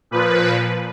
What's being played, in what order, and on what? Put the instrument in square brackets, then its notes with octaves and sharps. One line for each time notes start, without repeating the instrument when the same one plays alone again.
[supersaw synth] A#2 F3 B4